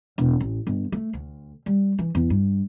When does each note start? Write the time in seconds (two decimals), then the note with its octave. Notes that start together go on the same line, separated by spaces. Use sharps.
0.18 E1
0.40 A1
0.67 G1
0.92 A3
1.13 D2
1.66 G3
1.99 E3
2.15 E2
2.30 G2